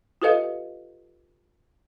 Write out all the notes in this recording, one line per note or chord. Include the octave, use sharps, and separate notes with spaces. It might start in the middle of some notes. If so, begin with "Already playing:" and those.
F4 G4 A4 B4 D#5 F5